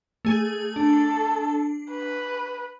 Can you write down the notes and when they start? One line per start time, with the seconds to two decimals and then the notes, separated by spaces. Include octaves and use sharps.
0.25 A3 G#4
0.76 D4 A4
1.92 B4